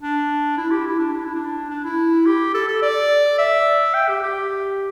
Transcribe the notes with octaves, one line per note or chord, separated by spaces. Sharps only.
D4
E4
G4
E4
D4
D4
E4
D4
D4
E4
G4
A4
A4
D5
E5
G5
G4
G4